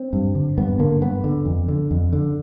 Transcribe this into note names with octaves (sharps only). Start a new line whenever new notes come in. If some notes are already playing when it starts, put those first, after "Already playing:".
Already playing: C4
G2
D3
G2 B3
D3 A#3
G2 B3
D3
F2
D3
F2
D3